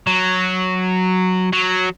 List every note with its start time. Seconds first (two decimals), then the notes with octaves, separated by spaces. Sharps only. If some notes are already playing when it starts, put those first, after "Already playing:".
0.07 F#3
1.53 F#3